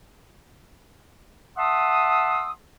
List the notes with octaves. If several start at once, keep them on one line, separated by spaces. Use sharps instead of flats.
E5 F#5 A5 C6 D#6 E6